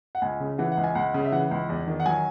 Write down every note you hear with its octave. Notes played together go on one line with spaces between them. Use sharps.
F#5
C#2 G#5
C#3
E3 F#5
F#5
C#2
G#5
C#2 F#5
C#3
E5
E3 F#5
C#2
E2
D#3
F#5
F#3 G#5